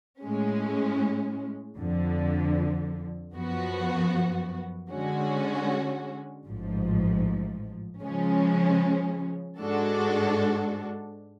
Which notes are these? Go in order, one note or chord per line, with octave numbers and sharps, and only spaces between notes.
A2 G#3 C#4
F2 D3 F3
F#2 F3 B3 F#4
D3 G#3 C#4 F#4
A1 G#2 F3
C#3 F3 G#3 C#4
G#2 G#3 D4 F#4 A4